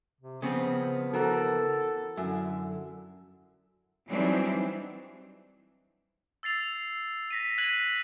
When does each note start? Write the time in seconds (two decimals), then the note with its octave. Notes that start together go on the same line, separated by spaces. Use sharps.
0.21 C3
0.42 C#3 F3 B3 C4
1.13 E3 F#4 A4 A#4
2.17 F#2 D3 E4
4.08 E3 F#3 G3 C4 D4 D#4
6.43 E6 A6 C7 F7
7.31 A#6 B6 D#7
7.58 F#6 G#6 B6 D#7 F#7